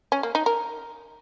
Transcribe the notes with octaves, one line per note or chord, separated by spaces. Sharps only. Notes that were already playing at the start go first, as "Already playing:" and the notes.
C#4
A#3
D#4
A#4